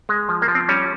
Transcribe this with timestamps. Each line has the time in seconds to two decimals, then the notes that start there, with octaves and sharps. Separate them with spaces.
0.09 G#3
0.29 F3
0.42 A#3
0.48 F3
0.55 C4
0.69 G3 C#4